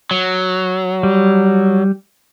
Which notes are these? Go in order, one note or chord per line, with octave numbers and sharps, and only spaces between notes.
F#3
G3